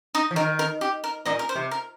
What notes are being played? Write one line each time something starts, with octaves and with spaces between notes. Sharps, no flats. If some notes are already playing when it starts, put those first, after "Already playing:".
D#4 D#5
F3
D#3 A#4
A#4
G4
A#4
A#2 D#4 D#5
A#4
C5
C3
A#4